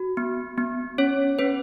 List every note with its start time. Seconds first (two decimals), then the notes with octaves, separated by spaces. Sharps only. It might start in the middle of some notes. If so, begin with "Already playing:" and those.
Already playing: F#4
0.17 B3
0.58 B3
0.98 C#4 C#5
1.39 C#4 B4